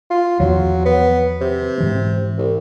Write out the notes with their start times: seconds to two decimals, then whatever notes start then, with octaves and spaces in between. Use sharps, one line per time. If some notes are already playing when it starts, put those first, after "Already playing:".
0.11 F4
0.40 E2 D#3 F3 F#3
0.85 B3
1.41 C3
1.78 G#2 E3 C4
2.38 C2